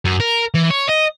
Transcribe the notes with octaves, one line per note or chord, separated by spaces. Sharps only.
F#2
A#4
E3
C#5
D#5